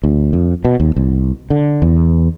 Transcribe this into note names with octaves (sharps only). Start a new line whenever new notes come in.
D2
F2
B2
D#2
C2
D3
E2